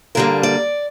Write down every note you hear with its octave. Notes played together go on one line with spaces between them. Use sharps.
G2 D3 G3 A#3 A#4
D5